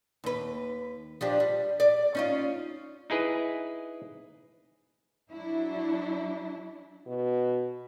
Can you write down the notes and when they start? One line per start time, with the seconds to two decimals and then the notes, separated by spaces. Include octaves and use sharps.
0.24 D#2 B4
1.21 F3 D4 G4
1.40 G3
1.80 D5
2.15 C#4 D#4 F4
3.10 D#4 E4 G#4 B4
5.29 F#3 D4 E4
7.06 B2